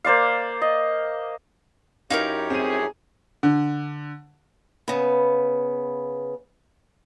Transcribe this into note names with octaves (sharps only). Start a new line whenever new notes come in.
A#3 C5 D5 F5
D#5
F#2 D#4 E4 G4 A#4 C#5 F5
F2 A2 C4 G#4 D#7
D3
C#3 B3